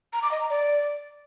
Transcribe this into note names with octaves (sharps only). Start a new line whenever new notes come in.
A#5
D6
D#5
A#5
D5